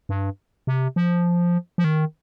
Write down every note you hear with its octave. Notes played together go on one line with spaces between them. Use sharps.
G2
C3
F3
F3
D#3